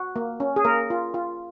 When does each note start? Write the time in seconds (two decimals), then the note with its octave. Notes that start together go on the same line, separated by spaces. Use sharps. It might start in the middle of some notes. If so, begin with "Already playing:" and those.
Already playing: F#4
0.16 A#3
0.40 C#4
0.56 G#4
0.65 A#3 A#4
0.90 F4
1.14 F4